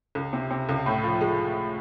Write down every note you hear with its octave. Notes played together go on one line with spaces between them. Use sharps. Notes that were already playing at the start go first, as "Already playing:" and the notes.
C#2
C3
C3
C#2
A2
F3
G#3